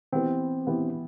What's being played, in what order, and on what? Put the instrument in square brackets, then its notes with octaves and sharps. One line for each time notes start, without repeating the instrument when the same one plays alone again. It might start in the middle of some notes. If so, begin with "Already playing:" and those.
[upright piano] E3 B3 E4 G4 B4 [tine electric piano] C4
[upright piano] E3 B3 E4 G4 B4